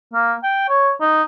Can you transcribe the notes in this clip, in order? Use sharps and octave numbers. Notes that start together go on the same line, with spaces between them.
A#3
G5
C#5
D#4